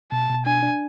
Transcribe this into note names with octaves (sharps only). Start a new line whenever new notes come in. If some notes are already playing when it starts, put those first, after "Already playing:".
B2 A5
B2
D4 G#5
D4